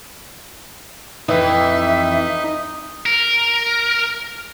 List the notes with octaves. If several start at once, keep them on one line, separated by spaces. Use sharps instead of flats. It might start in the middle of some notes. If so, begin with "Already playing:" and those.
F2 E3 D#4 E5
A#4